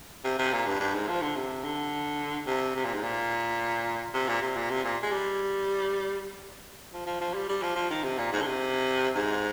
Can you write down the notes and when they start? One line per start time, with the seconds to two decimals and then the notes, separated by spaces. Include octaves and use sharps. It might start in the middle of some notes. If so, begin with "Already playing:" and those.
0.24 C3
0.39 C3
0.53 A#2
0.67 G2
0.80 G2
0.94 G#2
1.09 F3
1.22 D3
1.36 C3
1.64 D3
2.47 C3
2.76 C3
2.84 A#2
2.94 G#2
3.03 A#2
4.14 C3
4.28 A#2
4.42 C3
4.56 A#2
4.70 C3
4.84 A#2
5.03 G#3
5.12 G3
6.93 F3
7.06 F3
7.21 F3
7.34 G3
7.49 G3
7.63 F3
7.76 F3
7.91 D#3
8.03 C3
8.18 A#2
8.32 G#2
8.41 D3
8.46 C3
9.15 G#2